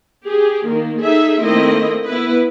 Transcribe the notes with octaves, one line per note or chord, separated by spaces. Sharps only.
G4 G#4
D#3 A#3
D#4 G#4 A4 E5
D#3 A3 A#3 C4 E4 D#5
B3 E4 B4